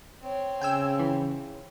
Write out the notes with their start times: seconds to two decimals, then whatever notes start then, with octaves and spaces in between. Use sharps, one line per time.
0.22 C4 C#5
0.61 C#3 G5 G#5 E6
0.99 E3